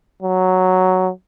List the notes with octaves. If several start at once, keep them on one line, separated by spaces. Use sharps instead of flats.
F#3